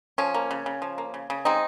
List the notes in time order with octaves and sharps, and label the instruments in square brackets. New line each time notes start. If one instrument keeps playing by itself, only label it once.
[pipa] F3 C#4
A#3
C#3
C#3
F3
A#3
C#3
C#3
G#3 C4 D#4